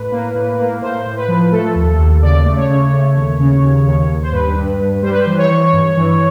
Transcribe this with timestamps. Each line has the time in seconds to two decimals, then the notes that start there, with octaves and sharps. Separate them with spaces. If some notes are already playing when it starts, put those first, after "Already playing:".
Already playing: A2 B4
0.12 A#3
0.35 A2
0.59 A#3
0.81 A2 C5
1.06 A2
1.17 B4
1.28 F3
1.52 A3 A4
1.75 D#2
1.99 D#2
2.22 C#3 D5
2.45 A3
2.57 C#5
2.69 C#3
2.92 A3
3.16 D#2
3.39 C#3
3.62 D#2
3.87 D#2
4.09 D#2
4.23 C5
4.32 G2 B4
4.56 G2
4.80 G2
5.02 G3 C5
5.11 B4
5.20 C5
5.26 E3
5.38 C#5
5.50 E3
5.73 G2
5.97 E3